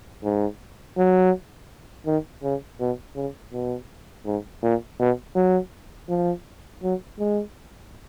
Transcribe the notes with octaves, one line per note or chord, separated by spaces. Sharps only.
G#2
F#3
D#3
C#3
B2
C#3
B2
G#2
A#2
B2
F#3
F3
F#3
G#3